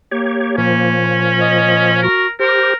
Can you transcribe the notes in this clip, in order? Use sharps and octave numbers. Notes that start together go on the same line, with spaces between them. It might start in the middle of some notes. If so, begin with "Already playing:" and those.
A#3 G4 C#5
A#2 F3 C#4
D#5
F#4 A#4
G4 A#4 C5